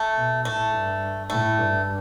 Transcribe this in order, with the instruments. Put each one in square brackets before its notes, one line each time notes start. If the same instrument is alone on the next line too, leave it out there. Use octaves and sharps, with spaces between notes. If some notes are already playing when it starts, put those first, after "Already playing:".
Already playing: [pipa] A3
[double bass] B2
[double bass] A2 [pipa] A3
[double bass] G2
[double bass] A2 [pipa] A3
[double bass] G2